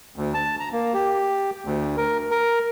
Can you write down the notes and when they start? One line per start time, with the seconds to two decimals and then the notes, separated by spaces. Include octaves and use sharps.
0.16 D2
0.34 A5
0.60 A#5
0.72 A#3
0.94 G4
1.65 D2
1.97 A#4
2.31 A#4